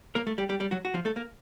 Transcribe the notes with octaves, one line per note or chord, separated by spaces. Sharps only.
A#3 A#4
A3 A4
G3 G4
G3 G4
G3 G4
F#3 F#4
F#4
F3 F4
A3 A4
A#3 A#4